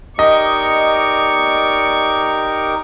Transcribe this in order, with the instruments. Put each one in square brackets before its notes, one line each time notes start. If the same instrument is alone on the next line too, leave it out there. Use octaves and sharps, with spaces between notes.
[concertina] D#4 G4 A#4 [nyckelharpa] D5 C#6 [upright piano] D#5